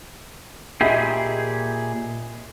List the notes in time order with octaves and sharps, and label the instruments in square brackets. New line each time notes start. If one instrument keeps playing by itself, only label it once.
[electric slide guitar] A#2 G4 G#4 [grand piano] D#5 E5 B5